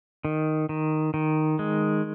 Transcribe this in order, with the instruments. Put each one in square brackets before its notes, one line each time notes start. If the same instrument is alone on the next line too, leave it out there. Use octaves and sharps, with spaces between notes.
[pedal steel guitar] D#3
D#3
D#3
G#3